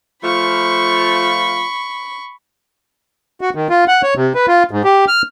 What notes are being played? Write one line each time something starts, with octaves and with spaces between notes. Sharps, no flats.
F3 A3 F4 B5 C#6
F#4
D#3
F4
F#5
C#5
C3
B4
F4
G#2
G4
F6